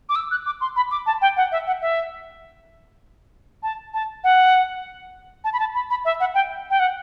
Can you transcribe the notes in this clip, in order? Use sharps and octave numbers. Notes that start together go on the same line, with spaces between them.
D6
E6
F#6
D6
C6
B5
D6
A5
G5
F#5
E5
F#5
E5
A5
A5
F#5
A5
B5
A5
B5
B5
E5
F#5
G5
G5
F#5